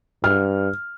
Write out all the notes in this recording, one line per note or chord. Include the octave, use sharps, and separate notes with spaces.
G2 F6